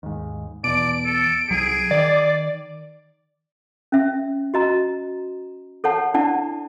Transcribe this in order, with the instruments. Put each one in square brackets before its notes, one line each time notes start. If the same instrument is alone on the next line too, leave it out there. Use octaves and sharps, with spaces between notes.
[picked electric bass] D#2 G#2
[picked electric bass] E2 B2 [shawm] D5 [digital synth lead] D7
[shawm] A4
[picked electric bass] C2 F#3 [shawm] G#4
[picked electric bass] D#3 [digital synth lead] D5
[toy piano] C#4 E5
F#4 D#5 A#5
A4 C#5 F#5 A5
D4 E4 D5 F#5 A5